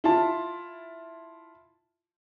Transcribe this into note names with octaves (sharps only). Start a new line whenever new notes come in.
E4 F4 A5